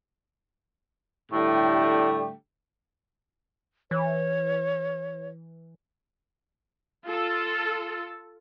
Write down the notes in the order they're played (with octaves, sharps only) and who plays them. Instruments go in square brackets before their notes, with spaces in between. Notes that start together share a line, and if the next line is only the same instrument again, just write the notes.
[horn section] A2 D3 G3 A3 G4
[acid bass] E3 [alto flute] C#5
[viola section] F4 A4